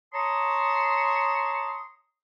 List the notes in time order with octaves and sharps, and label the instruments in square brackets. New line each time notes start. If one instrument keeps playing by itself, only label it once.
[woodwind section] C#5 A5 A#5 C6 C#6 D#6